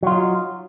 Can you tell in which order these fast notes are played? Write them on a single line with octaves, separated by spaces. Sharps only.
F#3 F4 D#4